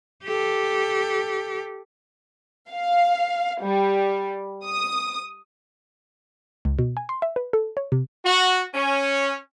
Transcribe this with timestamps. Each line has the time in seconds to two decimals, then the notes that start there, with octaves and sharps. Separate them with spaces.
0.24 G4 A4
2.71 F5
3.62 G3
4.67 D#6
6.65 C#2
6.79 B2
6.97 G#5
7.09 C6
7.22 E5
7.36 B4
7.53 A4
7.77 C#5
7.92 C3
8.25 F#4
8.74 C#4